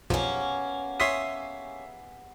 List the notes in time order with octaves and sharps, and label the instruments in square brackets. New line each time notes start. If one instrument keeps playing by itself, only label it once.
[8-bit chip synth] B1 F2 F3 [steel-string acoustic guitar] A#3 C#4 [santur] B3 G4 G#4
[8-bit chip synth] C#5 C6 D#6 [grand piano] E5 B6 C7